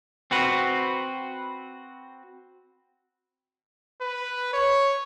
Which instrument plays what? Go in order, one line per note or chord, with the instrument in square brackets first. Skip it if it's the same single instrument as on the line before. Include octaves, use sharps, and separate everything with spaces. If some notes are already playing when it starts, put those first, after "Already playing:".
[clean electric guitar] C4 F#4 B4
[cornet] B4
C#5